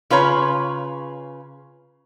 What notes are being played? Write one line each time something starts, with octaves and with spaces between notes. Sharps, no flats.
C#3 F4 B4 C#5 A#5